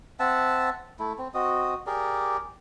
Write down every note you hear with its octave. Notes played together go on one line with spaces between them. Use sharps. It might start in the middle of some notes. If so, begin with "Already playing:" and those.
C4 E5 F#5 A5
A3 E4
C4
C4 F#4 D#5
G4 G#4 A#4 D5